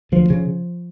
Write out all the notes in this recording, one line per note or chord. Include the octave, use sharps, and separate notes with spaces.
D2 F3
C#3